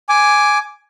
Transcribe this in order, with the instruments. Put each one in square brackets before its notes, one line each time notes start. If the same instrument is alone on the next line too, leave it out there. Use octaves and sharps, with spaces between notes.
[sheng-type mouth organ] G#5 D6